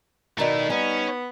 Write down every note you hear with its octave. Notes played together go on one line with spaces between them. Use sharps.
B2 D#3 A3 E4 F#4 D5 A#5
G3 B3 C#4 D#4